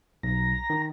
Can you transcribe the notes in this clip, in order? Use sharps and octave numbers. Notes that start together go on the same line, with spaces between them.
B1 A#5
D#3